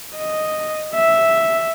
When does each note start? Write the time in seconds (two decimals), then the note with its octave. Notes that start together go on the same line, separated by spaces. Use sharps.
0.16 D#5
0.94 E5